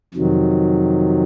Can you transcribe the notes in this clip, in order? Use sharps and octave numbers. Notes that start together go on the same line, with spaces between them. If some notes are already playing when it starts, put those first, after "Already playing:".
F2 C3 D#3 F#3